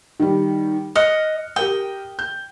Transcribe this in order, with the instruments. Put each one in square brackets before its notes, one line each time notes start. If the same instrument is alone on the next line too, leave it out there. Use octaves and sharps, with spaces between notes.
[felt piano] D#3 G3
[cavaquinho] D#5 [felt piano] F6 F#6 C#7
[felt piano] G4 A#4 D#6 [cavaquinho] G5
[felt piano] G6